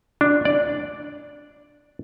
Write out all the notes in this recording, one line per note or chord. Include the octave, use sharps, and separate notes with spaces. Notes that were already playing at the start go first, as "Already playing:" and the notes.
D4
D5